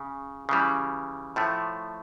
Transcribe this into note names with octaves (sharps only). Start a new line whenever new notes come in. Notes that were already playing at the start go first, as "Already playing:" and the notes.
Already playing: C#3
C#3 E3 G3
A2 F3 A3